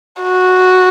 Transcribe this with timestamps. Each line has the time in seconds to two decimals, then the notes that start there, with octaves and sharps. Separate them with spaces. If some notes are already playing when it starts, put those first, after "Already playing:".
0.22 F#4